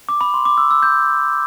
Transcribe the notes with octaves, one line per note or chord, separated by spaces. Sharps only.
D6
B5
C6
D6
E6
E6
G6